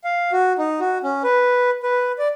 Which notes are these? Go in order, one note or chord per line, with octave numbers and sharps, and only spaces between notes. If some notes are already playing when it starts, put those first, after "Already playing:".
F5
F#4
D#4
F#4
C#4
B4
B4
D5